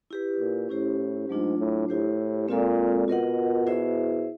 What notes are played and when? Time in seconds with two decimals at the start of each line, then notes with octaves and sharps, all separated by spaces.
0.10 E4 G4 B4
0.40 A#2
0.69 A2 C#4 E4 G4 C5
1.29 G#2 F#3 A3 D4 F4
1.58 A2
1.88 A2 E4 G4 C5
2.48 A#2 G#3 C4 F4 A4 D5
3.08 B2 F4 A#4 D#5 F#5
3.67 E4 G#4 C5 E5